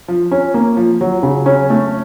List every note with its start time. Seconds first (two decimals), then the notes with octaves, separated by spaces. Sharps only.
0.08 F3
0.31 C#4
0.54 A#3
0.77 F3
1.01 F#3
1.23 C#3
1.46 C#4
1.70 A3